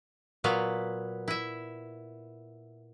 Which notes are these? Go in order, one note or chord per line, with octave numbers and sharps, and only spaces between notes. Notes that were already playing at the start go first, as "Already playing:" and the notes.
A#2 F#3 B3 F5
E4 E5